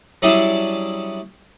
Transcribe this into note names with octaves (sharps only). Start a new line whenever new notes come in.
F#3 G3 C#4 D4 E4 G#4